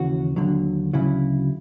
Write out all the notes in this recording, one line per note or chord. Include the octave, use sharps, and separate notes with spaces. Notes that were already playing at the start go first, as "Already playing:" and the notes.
Already playing: D#2 C#3 E3 F#4
D#2 D3 F#3
D2 C#3 F#3 E4